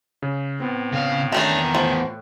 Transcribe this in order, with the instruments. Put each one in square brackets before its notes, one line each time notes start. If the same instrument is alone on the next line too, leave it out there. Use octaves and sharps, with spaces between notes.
[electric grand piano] C#3
[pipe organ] A2 [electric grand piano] B3 C4
[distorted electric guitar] C#3 F5
[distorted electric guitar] E2 A#5 [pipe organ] D#3 E5 [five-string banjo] A3 C#4 D4
[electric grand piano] A2 [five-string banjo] F3